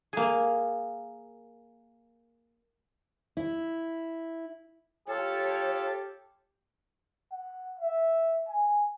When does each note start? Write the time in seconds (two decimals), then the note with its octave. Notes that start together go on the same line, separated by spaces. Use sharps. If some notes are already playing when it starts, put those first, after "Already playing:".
0.13 A#3 G#4
3.37 E4
5.09 F4 G4 A4 C#5 A5
7.31 F#5
7.79 E5
8.48 G#5